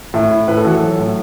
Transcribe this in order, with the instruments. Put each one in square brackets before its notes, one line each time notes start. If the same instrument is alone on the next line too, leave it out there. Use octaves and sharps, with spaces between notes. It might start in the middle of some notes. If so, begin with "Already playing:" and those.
[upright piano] A2 E5
E4
A2 B4
A4
E3 F#4
A4
F#3
A2